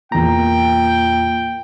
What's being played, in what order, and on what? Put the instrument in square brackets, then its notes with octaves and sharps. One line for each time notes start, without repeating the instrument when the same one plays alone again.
[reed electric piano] E2 A#5 [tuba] A#2 [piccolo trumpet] G5